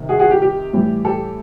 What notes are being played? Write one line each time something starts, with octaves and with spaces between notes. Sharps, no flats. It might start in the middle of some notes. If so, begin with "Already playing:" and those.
Already playing: C3 D#3
F#4 G#4
F#4 G#4
G4
G4
A2 E3 G3
G4 A4